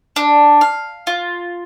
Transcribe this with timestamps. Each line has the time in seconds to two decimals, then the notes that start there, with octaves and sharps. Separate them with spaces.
0.16 D4
0.61 F5
1.07 F4